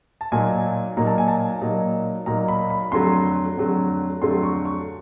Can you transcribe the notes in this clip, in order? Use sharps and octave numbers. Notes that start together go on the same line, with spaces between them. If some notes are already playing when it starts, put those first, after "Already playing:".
A5
A#2 F#3 A#3 D#4 G#5
A#2 F#3 A#3 D#4 A#5
A5
G#5
A5
A#2 F#3 A#3 D#4
A#2 F#3 A#3 D#4 A#5
B5
B5
F2 D3 F#3 A3 C6
F2 D3 F#3 A3
F2 D3 F#3 A3 C6
C#6
C#6